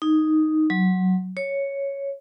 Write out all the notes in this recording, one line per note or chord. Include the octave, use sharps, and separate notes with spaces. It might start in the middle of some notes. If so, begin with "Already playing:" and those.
D#4
F#3
C#5